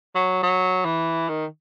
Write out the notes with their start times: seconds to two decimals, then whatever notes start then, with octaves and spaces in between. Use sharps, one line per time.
0.15 F#3
0.43 F#3
0.85 E3
1.29 D#3